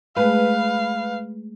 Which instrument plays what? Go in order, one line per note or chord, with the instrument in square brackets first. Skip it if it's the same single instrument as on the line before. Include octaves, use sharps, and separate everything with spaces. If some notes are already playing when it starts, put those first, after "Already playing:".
[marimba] G#3 A3 G#4 [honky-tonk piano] B4 [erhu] F5